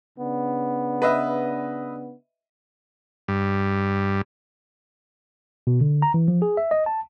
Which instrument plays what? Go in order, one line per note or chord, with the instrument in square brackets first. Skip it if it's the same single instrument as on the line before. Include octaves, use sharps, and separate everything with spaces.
[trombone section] C#3 B3 D4
[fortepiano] B4 D#5 E5
[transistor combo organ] G2
[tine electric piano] B2
D3
A#5
E3
F3
G#4
E5
D#5
A5